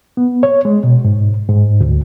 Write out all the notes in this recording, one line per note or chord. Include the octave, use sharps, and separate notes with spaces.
B3
C#5
G#3
B2
G#2
G#2
D2